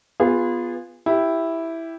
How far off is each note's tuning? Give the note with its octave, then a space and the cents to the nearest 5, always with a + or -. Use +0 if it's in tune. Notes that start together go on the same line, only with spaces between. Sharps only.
B3 +0 F4 +0 G#4 -25
E4 +0 G4 +0